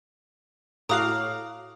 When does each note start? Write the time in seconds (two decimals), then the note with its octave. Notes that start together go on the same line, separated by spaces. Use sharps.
0.89 A2 F#4 F5 A#5 D6 D#6 C7